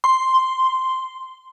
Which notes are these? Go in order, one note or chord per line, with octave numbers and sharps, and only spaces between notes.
C6